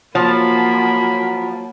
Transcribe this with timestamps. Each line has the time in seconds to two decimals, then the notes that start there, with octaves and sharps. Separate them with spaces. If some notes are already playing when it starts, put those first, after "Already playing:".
0.15 F3 F#3 A#3 B5